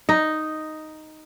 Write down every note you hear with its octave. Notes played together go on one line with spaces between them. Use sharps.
D#4